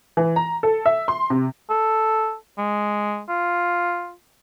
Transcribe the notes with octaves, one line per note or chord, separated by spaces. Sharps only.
E3
A#5
A4
E5
C6
C3
A4
G#3
F4